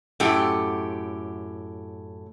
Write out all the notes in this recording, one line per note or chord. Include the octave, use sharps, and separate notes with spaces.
F#2 A2 G4